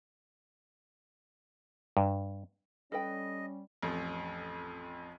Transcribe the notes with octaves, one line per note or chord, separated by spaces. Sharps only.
G2
G3 C#4 A4 B4 D#5 G5
A1 F2